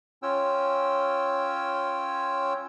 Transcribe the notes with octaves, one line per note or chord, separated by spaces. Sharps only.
C#4 F4 C#5 G5 E6